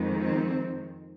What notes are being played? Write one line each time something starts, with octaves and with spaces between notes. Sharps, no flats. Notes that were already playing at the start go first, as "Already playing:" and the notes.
Already playing: F2 D#3 G#3
C4